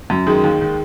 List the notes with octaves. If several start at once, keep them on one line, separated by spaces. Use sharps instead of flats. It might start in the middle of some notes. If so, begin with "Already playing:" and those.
F#2
D#3 G#3
D#2
D#3